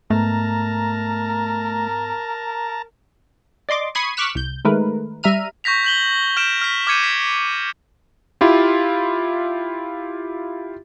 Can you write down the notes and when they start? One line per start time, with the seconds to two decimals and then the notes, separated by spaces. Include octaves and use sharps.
0.10 G#2 A3 B3 A#4 A5 A#5
3.69 D5 D#5 C6 D6
3.95 B5 C#6 D#6 G#6 C7 D#7
4.17 C#6 D6 F6 F#6 B6 E7
4.35 C2 G6
4.65 D#3 G#3 A3 A#4 B4
5.23 G3 E5 A#5 F6 D#7
5.64 C#6 G6 A#6 B6 F7
5.84 G6 F#7 G7
6.37 F6 G6 D7 E7
6.61 F6 B6
6.87 D6 F6 G6 G#6 C#7 D#7
7.04 B6
8.41 E4 F4 G4